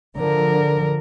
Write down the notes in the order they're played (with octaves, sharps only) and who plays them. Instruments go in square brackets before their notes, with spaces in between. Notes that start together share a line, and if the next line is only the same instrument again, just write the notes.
[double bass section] D3 F3 [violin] A#4